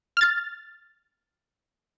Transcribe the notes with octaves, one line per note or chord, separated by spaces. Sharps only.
F6 A6